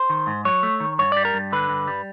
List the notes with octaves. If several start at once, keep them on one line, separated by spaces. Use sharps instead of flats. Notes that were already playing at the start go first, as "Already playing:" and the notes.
Already playing: C5
D#3
G#2
F#3 C#5
A3
D#3
G2 C#5
G3 D5
A#4
G2
D3 B4
G2
G3